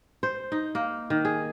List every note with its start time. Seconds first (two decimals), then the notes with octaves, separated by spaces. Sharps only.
0.23 C5
0.52 D#4
0.75 A#3
1.10 D#3
1.25 G#4